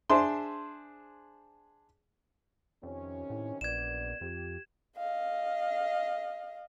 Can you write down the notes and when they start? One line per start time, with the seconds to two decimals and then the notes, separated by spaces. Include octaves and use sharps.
0.10 D4 G#4 C5 E5 C6
2.83 F2 C3 D#3 C#4
3.30 A2
3.61 A#1 F#2 B3 D5 G#6 E7
4.21 F2 G4
4.97 D#5 F5